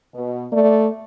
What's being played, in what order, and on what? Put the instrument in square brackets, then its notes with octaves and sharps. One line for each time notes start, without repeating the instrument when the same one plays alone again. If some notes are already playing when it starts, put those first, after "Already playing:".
[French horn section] B2
[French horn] A3 [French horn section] D5